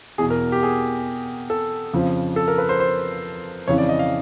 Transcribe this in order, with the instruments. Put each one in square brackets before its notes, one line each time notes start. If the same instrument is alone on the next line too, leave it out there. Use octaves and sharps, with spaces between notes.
[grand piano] E2 B2 G#4
A#4
G4
G#4
A4
F2 C#3 F3
A4
A#4
B4
C5
C5
F2 C#3 E3 C#5
D5
D#5
F5